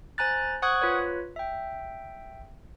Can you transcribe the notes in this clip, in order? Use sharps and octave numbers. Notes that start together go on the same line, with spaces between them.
C5 G#5 A#5 F#6 A6
C5 F#5 C#6 D#6 F#6 G#6
F4 B4 C#5
E5 G5